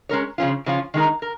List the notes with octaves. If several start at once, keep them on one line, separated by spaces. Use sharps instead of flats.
G#3 C#4 A#4 C#5
C#3 F3 C#4 F4
C#3 F3 C#4 F4
D#3 G#3 D#4 A#4
A#4